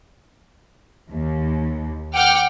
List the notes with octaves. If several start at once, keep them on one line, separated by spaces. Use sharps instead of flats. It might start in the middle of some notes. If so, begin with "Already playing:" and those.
D#2
F#5 G5 D6 F6